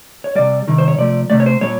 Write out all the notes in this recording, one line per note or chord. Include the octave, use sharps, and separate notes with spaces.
C#5
C3 D#3 G3 D5
C3 D#3 G3
C5
C#5
C3 F3 A3 D5
C3 F3 A3 D5
C#5
C5
A#2 G3 C#5